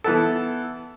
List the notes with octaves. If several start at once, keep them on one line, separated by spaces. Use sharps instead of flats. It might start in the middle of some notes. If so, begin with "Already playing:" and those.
E3 B3 A4